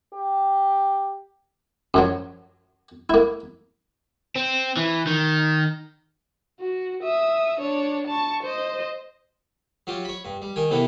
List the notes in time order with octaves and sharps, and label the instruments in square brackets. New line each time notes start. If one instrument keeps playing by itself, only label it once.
[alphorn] G4
[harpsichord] F#2 F3 F#3
A#3 E4
[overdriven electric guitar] C4
E3
D#3
[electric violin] F#4
E5 D#6
D4 C#5
A5 C#6
C5 D#5
[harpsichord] F#3 F4 G4
C#5 B5
G2
G3
D#3 G5 G#5
C3 E3 A#3 B3 A4